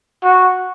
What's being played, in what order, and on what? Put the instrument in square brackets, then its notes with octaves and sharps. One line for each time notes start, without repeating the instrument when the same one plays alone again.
[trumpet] F#4